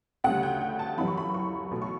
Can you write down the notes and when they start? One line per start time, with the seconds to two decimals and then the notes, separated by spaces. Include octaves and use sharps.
0.24 D2 C#3 G3 F#5
0.43 G5
0.61 G5
0.79 A5
0.97 F#2 E3 G3 B5
1.08 C#6
1.17 B5
1.34 C#6
1.71 B1 B2 F#3 A3 B5
1.82 C#6